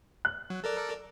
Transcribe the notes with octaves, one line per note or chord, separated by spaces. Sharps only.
F#6
F#3
A4 A#4 D5